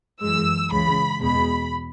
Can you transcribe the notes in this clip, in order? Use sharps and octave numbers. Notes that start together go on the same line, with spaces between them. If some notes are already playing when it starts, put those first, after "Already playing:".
F#2 E3 G#3 E6
C#2 C#3 E3 G#3 B5
E2 B2 G#3 B5